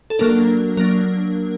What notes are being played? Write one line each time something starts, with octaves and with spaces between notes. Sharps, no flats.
A4
F#3 A#3 D4 A#4
F#3 A#3 D4 A#4